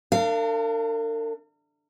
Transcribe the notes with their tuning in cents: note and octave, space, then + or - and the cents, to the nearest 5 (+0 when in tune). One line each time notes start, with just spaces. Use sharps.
D4 +15 A#4 -45 F5 -30